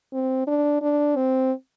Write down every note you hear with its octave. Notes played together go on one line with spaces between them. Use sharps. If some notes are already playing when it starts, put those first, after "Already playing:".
C4
D4
D4
C4